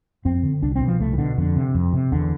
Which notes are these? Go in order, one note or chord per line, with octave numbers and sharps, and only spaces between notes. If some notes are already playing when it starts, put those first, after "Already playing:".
F2 C4
D3
C2 D4
C4
B2
F3
C2 A3
E3
B2 D3
F2 D3
C3
F2
C3
E2 D3